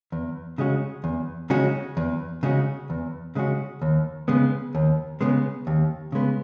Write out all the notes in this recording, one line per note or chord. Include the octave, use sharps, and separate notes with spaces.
E2
C#3 G#3 C#4 F#4
E2
C#3 G#3 C#4 F#4
E2
C#3 G#3 C#4 F#4
E2
C#3 G#3 C#4 F#4
D#2
C#3 G#3 B3
D#2
C#3 G#3 B3
D#2
C#3 G#3 B3